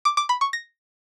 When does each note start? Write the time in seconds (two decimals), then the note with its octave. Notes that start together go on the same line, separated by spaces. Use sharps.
0.05 D6
0.17 D6
0.29 B5
0.41 C#6
0.53 A#6